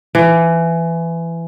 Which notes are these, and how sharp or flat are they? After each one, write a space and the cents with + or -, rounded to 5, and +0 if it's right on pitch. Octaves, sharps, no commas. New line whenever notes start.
E3 +20